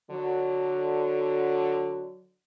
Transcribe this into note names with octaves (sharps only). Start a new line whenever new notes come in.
D3 F#3